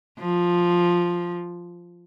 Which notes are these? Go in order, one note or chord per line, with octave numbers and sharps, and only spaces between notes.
F3